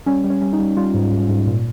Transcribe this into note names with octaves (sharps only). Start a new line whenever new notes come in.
G3 C#4
G3
C#4
G3 C#4
D#4
G3
G3 F4
G#2
G#2
G#2
A#2